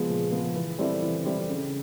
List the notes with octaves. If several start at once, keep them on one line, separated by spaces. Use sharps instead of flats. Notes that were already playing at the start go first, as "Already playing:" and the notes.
Already playing: F3 G#3 B3
A#2
F3 G#3 B3
E3
G3 C4 E4 A4
E3
G3 C4 E4 A4
C#3